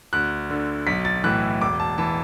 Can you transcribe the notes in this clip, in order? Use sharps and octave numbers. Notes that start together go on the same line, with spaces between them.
D2 F#6
D3
B1 B6
A6
A2 E3 F#6
E1 D6
A5
E3 A5